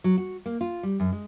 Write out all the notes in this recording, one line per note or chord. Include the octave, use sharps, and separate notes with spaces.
F#3
F#4
A#3
F4
G3
F#2
G#3